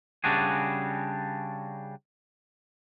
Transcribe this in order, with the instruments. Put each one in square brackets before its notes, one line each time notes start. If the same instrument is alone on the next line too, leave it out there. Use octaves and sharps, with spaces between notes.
[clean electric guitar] C#3 G3 D4 F#4 G#4